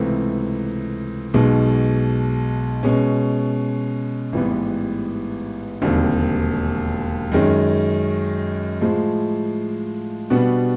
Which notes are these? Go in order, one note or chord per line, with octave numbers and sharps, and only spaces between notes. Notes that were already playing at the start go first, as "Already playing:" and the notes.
Already playing: C#2 C3 E3 A3
B1 B2 G#3
B2 G#3 C#4
A1 G#2 E3 G3 B3
E1 D#2 D3 G3 C4
F#2 D#3 G#3 C#4
A2 F3 G#3
B2 G3 B3 D4 F#4